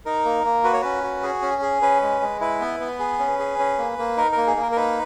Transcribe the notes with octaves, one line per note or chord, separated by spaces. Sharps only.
D#4 A#4
A#3
A#3
F#4 B4
C#5
C#4 B4
F#4
G#4
C#4
G#4
C#4 B4
G#3
G#3
E4 B4
B3
B3
G#4
C#4
G#4
C#4
A#3
A#3
D#4 A#4
A#3 A#4
G#4
A#3
A#4
A#4
D#4 B4